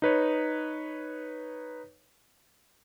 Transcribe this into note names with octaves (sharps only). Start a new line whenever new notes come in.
D#4 B4 C#5